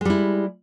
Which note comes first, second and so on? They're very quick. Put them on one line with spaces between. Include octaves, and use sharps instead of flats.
G#3 G3 E4